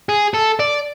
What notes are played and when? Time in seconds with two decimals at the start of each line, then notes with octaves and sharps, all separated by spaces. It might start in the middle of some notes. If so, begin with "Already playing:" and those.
0.09 G#4
0.34 A4
0.59 D5